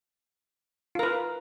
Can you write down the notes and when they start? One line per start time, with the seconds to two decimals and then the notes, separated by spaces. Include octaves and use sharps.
0.95 F4
0.99 A#4
1.03 B4